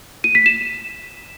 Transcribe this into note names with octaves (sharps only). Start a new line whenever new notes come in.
D#7
B6
E7